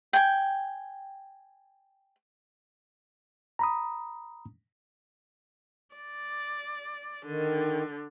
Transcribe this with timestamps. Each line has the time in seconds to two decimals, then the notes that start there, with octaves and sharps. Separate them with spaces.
0.13 G5 G#5
3.59 A#5 B5 D#6
5.95 D5
7.25 D3 D#3